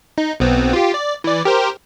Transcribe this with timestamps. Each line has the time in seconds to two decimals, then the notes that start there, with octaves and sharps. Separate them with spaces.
0.18 D#4
0.40 B1 B3 C4
0.73 F4 G4
0.94 D5
1.24 E3 D5
1.45 G4 A#4 C5